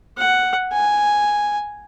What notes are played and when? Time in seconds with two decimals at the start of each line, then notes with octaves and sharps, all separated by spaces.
0.18 F#5
0.73 G#5